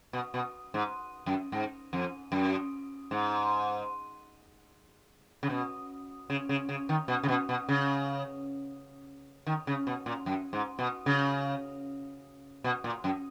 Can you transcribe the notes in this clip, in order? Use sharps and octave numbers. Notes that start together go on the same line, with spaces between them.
B2
B2
G#2
F#2
G#2
F2
F#2
G#2
C#3
B2
C#3
C#3
C#3
D#3
B2
C#3
B2
B2
C#3
D#3
C#3
B2
A#2
F#2
G#2
B2
C#3
B2
A#2
F#2